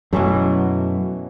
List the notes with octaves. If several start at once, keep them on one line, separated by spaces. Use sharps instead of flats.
F#2 B2 E3 F#3 A3